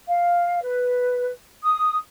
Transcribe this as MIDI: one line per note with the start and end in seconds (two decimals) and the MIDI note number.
0.08 0.60 77
0.62 1.30 71
1.63 1.98 87